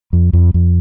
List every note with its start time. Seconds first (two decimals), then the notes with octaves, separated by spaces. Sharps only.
0.13 F2
0.33 F2
0.54 F2